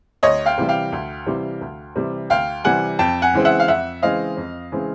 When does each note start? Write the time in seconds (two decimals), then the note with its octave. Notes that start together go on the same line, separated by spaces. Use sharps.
0.23 D2 C#5 D#5
0.46 F5 G5
0.58 C3 E3 G3
0.68 F5 G5
0.92 D2
1.26 C3 E3 G3
1.61 D2
1.96 C3 E3 G3
2.30 D2 F5 G5
2.64 C3 E3 G3 F#5 G#5
2.99 F2 G5 A5
3.22 F#5 G#5
3.34 C#3 E3 G#3 C4
3.45 E5 F#5
3.60 F5
3.68 F2 E5 F#5
4.02 C#3 E3 G#3 C4 D#5 F5
4.37 F2
4.72 C#3 E3 G#3 C4